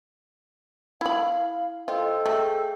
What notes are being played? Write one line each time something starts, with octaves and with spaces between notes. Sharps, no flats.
E4 F5 B5
F4 A4 C5 D#5 G5
A3 G#4 F5 G5